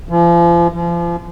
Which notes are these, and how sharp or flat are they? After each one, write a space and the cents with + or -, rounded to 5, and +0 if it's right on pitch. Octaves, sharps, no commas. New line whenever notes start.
F3 -35
F3 -35